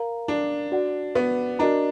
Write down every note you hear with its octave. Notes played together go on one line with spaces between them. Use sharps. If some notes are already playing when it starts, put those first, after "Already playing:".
Already playing: A#4 F5 A#5
D4
F#4 D5 F#5
B3
D4 F#4 A#4 D#5 A#5